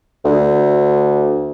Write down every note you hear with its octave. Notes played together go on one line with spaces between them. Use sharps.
D2